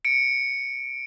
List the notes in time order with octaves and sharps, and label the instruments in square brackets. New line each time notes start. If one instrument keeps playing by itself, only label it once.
[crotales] C#7 D7